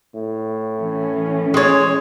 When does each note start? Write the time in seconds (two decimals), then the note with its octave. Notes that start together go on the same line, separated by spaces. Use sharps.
0.15 A2
0.80 E3 C#4
1.54 G#3 C#5